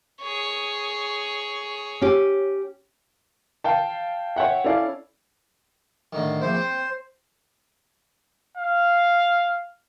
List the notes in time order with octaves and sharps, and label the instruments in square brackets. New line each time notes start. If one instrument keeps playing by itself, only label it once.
[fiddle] G#4 C#5
[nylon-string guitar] C#4 G4
[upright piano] F5 G5 A5
C#5 E5 F#5 G5
C#4 E4 A4 D5 F5
[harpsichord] A2 D3 D#3
[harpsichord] A#1 E4 [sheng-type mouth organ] C5
[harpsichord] C4
[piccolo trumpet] F5